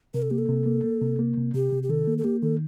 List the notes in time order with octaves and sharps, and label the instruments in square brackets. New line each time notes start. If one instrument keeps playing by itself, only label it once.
[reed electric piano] C3 [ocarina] A#4
[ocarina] A4
[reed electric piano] A#3 [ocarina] G4
[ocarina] A4
[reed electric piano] C3
A#3
A#3
C3
A#3
C3
[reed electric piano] C3 [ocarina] G4
[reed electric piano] C3
[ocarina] G4
[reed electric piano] D#3 [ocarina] A4
[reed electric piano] A#3
[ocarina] A4
[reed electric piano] A#3 [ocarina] G4
[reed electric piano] D#3 [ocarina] A4